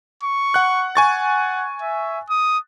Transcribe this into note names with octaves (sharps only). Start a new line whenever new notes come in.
C#6
F#5 F#6
F#5 G#5 C#6 A6
E5
D#6